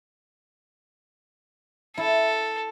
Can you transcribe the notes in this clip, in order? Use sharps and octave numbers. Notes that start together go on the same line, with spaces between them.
E4 A4